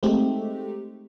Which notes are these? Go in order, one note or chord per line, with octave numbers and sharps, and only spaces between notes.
G#3 A3 C4 D#4 G4